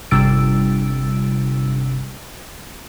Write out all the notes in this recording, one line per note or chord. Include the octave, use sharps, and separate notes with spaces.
G1 C3 G3 E6 A6 D7